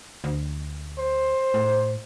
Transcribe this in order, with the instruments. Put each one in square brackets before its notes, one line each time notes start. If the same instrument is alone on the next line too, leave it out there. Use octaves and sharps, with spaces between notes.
[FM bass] D2
[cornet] C5
[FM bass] A2